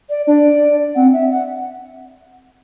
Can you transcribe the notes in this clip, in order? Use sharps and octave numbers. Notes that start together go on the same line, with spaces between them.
D5
D4 D5
C4 F#5
E5
F#5